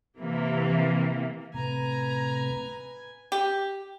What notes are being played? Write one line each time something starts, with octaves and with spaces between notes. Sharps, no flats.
C3 E3 A#3
A2 C3 B4 G#5 A#5
G4